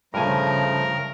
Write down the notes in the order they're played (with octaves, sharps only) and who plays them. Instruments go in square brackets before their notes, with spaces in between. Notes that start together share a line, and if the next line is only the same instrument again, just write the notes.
[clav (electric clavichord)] G2 G#5 [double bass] C#3 [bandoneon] F3 A3 [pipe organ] A#4